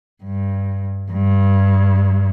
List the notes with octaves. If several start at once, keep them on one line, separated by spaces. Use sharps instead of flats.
G2
G2